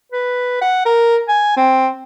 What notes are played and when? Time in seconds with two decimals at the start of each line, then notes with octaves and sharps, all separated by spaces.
0.12 B4
0.61 F#5
0.85 A#4
1.28 G#5
1.57 C4